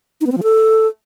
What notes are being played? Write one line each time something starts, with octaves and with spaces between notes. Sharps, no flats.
D#4
B3
C4
F3
A4